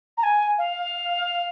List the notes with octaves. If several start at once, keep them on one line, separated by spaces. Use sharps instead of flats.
A#5
G#5
F5